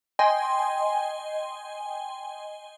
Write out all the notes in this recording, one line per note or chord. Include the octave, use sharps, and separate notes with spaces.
D#5 G5 G#5 C6